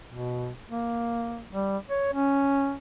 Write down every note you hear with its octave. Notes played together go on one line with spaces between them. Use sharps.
B2
A#3
G3
C#5
C#4